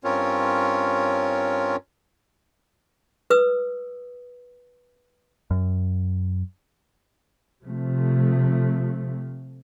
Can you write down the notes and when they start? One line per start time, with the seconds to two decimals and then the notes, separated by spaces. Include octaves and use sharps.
0.04 G2 C4 C#4 F4 A#4 C#5
3.30 B4 D#6 E6
5.51 F#2
7.63 C3 F3 A3